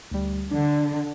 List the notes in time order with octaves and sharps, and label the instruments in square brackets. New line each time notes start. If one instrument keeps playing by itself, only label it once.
[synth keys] D2 G3
[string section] D3 [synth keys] D4